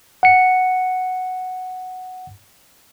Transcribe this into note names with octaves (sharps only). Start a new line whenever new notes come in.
F#5 C#7